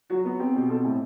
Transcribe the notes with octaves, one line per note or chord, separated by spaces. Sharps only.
F#3 F#4
B3
C4 G4
B2 G4
C4 A4
A2